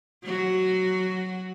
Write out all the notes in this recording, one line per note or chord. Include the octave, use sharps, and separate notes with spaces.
F#3 F#4